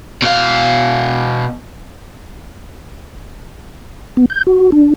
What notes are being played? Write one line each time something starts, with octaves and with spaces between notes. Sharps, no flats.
B2 F5
B3
G6
F#4
D4